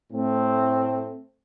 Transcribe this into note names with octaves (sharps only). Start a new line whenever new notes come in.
A2 A3 C4